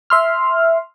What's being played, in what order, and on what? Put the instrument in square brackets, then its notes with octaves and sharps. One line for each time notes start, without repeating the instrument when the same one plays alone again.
[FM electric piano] E5 C6 F6